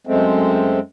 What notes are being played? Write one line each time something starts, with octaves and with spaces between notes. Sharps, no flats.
F#2 G#3 A3 C4